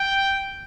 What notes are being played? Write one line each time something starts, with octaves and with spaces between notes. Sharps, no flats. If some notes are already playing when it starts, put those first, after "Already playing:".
Already playing: G5